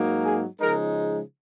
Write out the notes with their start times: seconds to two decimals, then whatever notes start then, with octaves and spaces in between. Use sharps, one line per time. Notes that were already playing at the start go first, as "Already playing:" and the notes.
Already playing: G#2 F#3 A#3 D#4
0.23 G#4
0.61 C#3 F3 G#3 D#4 A#4